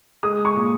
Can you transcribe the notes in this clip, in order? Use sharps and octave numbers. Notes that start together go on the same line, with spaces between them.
G#3 D#6
C#6
A#2